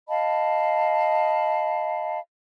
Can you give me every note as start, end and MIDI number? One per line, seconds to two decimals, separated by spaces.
0.08 2.19 75
0.08 2.19 77
0.08 2.19 81
0.08 2.19 83